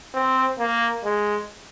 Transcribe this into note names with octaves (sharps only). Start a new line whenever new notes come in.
C4
A#3
G#3